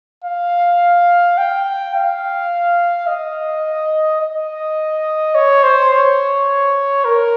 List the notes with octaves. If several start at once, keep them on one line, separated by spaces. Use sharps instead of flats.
F5
G5
F5
D#5
D#5
C#5
C5
C#5
A#4